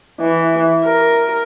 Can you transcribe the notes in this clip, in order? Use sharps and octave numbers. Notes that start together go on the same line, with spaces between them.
E3
A#4